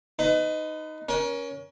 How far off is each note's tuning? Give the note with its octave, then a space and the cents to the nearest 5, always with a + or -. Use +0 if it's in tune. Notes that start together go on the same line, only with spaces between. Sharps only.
D#4 +0 B4 +35
C#4 +15 A#4 +35